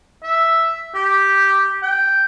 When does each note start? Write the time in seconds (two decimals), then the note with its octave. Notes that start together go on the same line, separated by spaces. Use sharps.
0.23 E5
0.94 G4
1.83 G5